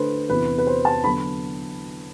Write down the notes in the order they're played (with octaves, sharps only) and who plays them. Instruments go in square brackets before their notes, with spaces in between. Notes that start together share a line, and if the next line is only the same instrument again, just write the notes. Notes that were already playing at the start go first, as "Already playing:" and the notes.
Already playing: [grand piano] D3 A3 D4 [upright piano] B4 C5
[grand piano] E2 C3 E3 B3 E4 [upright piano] B4
[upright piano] B4
C5
A5
[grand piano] D3 [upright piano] B5
[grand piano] F#3 B3